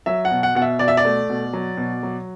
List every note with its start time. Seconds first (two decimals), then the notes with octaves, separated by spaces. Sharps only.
0.06 F#3 E5
0.25 F#5
0.31 B2
0.43 F#5
0.55 B2 F#5
0.62 E5
0.79 B2 D5
0.88 E5
0.97 D5
1.05 A3
1.29 B2
1.53 F#3
1.77 B2
2.03 F#3